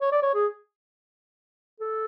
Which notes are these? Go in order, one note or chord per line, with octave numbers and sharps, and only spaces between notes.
C#5
D5
C#5
G#4
A4